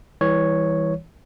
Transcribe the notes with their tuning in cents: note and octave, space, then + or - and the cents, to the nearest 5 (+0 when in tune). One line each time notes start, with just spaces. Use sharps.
E3 -15 G3 +20 C#5 +0